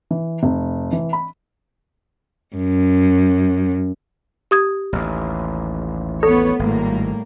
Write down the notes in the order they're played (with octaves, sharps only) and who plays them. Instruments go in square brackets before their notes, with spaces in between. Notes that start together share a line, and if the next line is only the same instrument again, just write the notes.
[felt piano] E3
F1
E3
B5
[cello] F#2
[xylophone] G4 D#6 G#6
[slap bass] A1 D#2
[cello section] B3 C#5 [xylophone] A4
[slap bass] G#1 [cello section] A2 G3 A#3